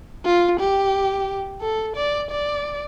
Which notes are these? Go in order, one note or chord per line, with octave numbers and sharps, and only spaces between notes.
F4
G4
A4
D5
D5